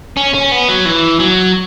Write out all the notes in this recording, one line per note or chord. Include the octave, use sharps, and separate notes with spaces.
C#4
C#4
B3
F#3
E3
F#3